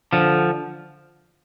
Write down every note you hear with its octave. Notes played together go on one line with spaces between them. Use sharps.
D3 F3